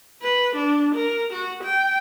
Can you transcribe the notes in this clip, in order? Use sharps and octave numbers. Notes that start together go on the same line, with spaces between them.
B4
D4
A#4
F#4
G5